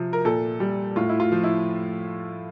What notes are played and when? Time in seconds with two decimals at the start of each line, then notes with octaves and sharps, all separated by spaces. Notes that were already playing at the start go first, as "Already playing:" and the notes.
Already playing: C3 F3
0.13 A#4
0.25 A#2 A4
0.60 G3
0.96 A2 F4
1.09 E4
1.20 F4
1.32 F3
1.44 E4